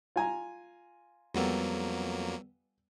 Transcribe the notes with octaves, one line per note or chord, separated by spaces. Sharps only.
F4 G#5 A#5
F2 F#3 G3 A#3 B3 A4